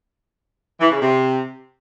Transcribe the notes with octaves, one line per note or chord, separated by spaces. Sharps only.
E3
C#3
C3